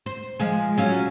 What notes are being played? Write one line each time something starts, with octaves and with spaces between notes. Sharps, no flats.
C5
F3 G#3 G#4
F#3 C#4 F4